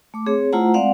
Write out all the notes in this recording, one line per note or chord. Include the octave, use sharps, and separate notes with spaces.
A3 D6
C4 G#4 C#5
A3 E4 F4 C5 F#5 A#5
G#3 C4 D5 F5 F#5